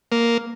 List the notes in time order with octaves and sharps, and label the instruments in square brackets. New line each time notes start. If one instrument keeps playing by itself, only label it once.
[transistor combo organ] A#3